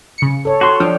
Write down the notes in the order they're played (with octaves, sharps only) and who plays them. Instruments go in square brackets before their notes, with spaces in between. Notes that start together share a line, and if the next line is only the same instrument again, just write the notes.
[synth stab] C#3 C#7
[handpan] A4 C#5
[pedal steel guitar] F#4 C6
[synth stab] F3 [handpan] D4 [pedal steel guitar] G5 F6